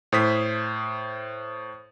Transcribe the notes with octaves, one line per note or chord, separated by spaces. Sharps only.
A2 C5 D#6 B6